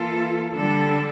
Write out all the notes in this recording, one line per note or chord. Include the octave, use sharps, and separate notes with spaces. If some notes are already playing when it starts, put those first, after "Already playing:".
Already playing: E3 A#3 F4 A4
D3 G3 D4 A4